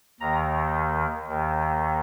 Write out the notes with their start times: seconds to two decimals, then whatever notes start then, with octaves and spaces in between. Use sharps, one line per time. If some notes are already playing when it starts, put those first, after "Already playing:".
0.20 D#2 D#3 A#5
1.27 D#2 D#3